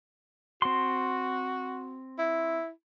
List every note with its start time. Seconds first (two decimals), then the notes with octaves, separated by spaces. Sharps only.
0.62 C4 F#4 C6
2.18 E4